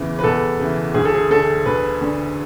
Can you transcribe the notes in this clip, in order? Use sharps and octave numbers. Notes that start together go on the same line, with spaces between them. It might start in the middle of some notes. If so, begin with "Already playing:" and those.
Already playing: E2 C#3 E3
B4
E2 A4
C#3 E3
D2 G#4
A4
G#4
D3 A4
D2 B4
D3